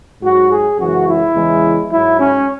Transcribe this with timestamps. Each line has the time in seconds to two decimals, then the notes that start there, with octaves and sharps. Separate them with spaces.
0.22 G#2 F#3 F#4
0.50 G#4
0.79 F#2 C#3 E3 G#3 F#4
1.07 E4
1.34 E2 C#3 E3 G#3
1.90 G#2 F#3 E4
2.19 C#4